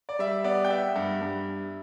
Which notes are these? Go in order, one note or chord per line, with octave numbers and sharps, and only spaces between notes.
D5
G3 E5
B3 D5
G5
B3 E5
G2
G2